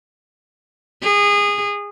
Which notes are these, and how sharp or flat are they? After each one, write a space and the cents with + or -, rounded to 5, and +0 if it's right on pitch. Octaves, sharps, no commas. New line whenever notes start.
G#4 -25